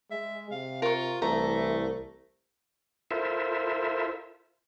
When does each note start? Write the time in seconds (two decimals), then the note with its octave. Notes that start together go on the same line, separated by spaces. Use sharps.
0.11 G#3 E5
0.51 C3 F5
0.82 F4 A#4 C#6
1.22 C2 E3 A3 A#5
3.11 E4 F4 A4 A#4 C5 E5